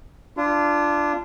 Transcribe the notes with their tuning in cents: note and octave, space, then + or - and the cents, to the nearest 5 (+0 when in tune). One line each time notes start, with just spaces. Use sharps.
D4 +0 F4 -30